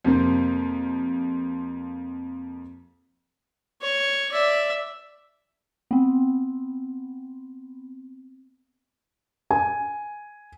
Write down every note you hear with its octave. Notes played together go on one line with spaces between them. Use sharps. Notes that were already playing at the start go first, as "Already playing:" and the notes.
F2 C3 A#3 C4
C#5
D5 E5
B3 C4
G#5